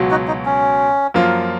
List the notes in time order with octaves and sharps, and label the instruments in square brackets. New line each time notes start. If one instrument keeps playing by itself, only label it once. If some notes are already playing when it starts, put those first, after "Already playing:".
Already playing: [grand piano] C#2 B2 F#3
[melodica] D#4 F#4
D#4
C#4
[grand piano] F#2 F3 A#3 F4